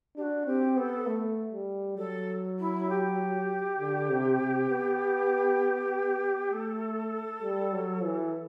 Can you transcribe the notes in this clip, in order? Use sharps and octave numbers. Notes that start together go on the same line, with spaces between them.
D4 F#4 G4
C4 G4
B3 A4
A3
G3
F#3 A4
E4
G4
D3
C3
C3
B3
A3 A4
G3
F#3
E3